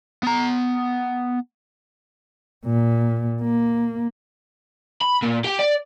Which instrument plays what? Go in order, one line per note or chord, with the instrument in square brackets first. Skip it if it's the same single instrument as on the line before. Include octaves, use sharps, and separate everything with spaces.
[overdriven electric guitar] B3 A#5
[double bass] A#2
A#3
[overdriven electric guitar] B5
A#2
G4 G5
D5